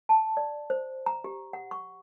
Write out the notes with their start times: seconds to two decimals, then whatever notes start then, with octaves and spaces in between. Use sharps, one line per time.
0.09 A5
0.37 D5
0.70 C5
1.06 A#5
1.24 G4
1.53 F#5
1.71 C#6